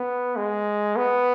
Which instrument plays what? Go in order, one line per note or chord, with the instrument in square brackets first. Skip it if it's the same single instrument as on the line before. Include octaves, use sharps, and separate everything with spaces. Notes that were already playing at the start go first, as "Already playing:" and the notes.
Already playing: [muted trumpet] B3
G#3
B3